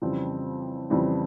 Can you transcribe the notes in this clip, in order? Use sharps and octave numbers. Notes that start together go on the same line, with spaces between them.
F2 C#3 E3 G3 C4
F2 C#3 E3 G3 C4